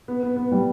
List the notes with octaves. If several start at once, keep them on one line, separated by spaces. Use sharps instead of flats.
B3
B3
B3
G3